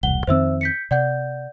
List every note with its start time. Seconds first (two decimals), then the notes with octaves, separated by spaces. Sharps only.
0.03 E1 C2 F#5 G7
0.27 F2 D#3 C4 C5 E5 E6
0.61 G6 B6 C#7
0.91 C3 D5 F#5 G6